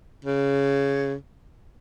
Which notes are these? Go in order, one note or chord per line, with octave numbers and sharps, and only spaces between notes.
C#3